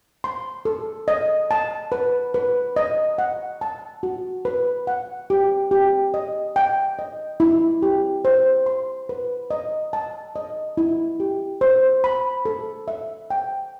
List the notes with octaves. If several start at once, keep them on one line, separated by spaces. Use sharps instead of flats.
C6
A4
D#5
A5
B4
B4
D#5
F#5
A5
F#4
B4
F#5
G4
G4
D#5
G5
D#5
E4
G4
C5
C6
B4
D#5
A5
D#5
E4
G4
C5
B5
A4
E5
G5